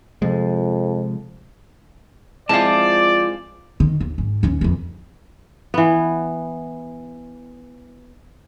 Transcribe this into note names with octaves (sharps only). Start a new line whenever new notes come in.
F2 C3 F3 G#3
F3 G#3 C4 E4 F4 D5 F5 A5
D#3
D#2
G#2
D#2 C#4
F2 E3
E3 B3